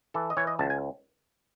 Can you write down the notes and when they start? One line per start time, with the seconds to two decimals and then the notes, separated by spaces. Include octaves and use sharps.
0.14 E3 A4
0.30 D#5
0.37 E3 C#5
0.47 D#5
0.59 C#2 A5
0.70 G#5